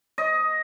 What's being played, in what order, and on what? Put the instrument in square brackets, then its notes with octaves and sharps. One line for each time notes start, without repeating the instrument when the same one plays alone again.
[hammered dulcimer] D#5